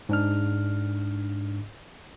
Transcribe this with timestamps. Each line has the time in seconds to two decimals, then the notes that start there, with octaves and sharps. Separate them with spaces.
0.09 G#2 D4 F6